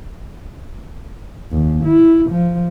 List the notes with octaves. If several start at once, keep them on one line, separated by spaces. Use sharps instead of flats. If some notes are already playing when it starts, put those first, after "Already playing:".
D#2
E4
F3